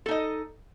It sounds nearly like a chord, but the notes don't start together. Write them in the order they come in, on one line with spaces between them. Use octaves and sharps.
A4 D#4 D#5